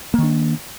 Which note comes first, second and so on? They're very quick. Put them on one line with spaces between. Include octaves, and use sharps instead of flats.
A#3 D#3 D4